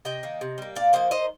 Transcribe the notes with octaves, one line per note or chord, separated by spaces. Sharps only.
C3 D#5 G5
D#3 A#3
C3
G3 A#3
A#2 D5 F5
F3 A#3 C5 D#5
D#3 C5 D#5